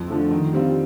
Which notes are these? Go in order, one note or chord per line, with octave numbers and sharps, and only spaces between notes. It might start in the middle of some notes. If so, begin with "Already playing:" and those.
Already playing: F2
D3 F3 A3
D#3
G3 C4 F4